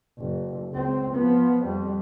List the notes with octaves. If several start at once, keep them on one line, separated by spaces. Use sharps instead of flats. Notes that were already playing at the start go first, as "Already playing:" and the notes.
F#1
C#2 C4
F3 B3
F2 G3